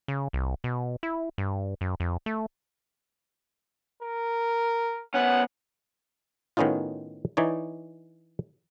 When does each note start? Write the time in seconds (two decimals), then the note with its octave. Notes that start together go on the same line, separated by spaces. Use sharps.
0.08 C#3
0.33 C2
0.64 B2
1.03 E4
1.38 G2
1.81 F#2
2.00 F2
2.26 A3
4.02 A#4
5.14 B3 C#4 F#5
6.57 A2 D#3 B3 C#4 D#4 F4
7.37 E3 D#4 C#5 D5